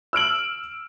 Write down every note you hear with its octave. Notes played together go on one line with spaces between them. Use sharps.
E6 F6 D7 F#7